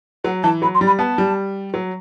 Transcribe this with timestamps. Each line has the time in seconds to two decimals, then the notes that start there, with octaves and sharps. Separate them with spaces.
0.24 F#3 F#5
0.43 E3 A5
0.62 F#3 B5
0.74 C6
0.81 G3
0.86 B5
0.99 B3 A5
1.18 G3
1.74 F#3